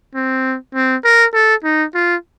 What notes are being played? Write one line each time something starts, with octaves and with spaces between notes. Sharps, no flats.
C4
C4
A#4
A4
D#4
F4